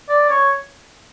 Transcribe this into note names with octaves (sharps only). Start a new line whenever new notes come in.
D5
C#5